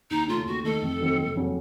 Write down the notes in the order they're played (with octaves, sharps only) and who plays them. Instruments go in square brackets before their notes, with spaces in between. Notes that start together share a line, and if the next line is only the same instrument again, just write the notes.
[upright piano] D#2 [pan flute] D#4
[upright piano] C#3 A3 [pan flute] F4
[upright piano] D#2 [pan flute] F#4
[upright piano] D#3 A3 D#4 [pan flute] A4
[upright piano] F2
D#3 F#3 C4
F#1
F2 C#3 F#3